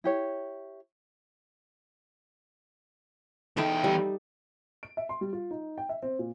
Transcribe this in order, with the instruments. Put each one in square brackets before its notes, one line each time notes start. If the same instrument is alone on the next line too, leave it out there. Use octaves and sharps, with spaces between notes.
[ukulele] E4 G4 C#5
[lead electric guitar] E2 G5 [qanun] D#4 A4 E5
[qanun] G3
[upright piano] D7
E5
C6
G3
F4
D#4
G5
E5
C4
A#2